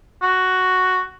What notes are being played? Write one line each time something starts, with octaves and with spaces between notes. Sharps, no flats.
F#4